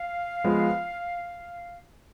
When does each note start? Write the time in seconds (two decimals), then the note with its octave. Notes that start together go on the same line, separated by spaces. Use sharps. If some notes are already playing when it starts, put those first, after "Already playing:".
Already playing: F5
0.44 F3 G#3 B3